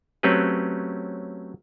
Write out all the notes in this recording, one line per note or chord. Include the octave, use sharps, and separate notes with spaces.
F#3 A3 C4 C#4 G4 B4